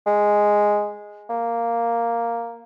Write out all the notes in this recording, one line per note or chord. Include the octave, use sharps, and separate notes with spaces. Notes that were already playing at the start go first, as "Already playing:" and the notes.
G#3
A#3